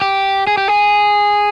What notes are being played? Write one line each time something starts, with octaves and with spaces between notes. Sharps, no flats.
G4
G#4
G4
G#4